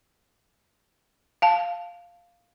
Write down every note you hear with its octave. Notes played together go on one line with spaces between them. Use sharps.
F5 A5